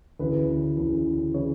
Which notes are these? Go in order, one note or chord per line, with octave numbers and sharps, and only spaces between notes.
D2 C#3 E3 B4
D2 C#3 E3
C#3 E3 C#5